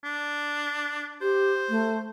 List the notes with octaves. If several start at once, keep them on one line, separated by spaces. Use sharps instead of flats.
D4
G4 C5
A3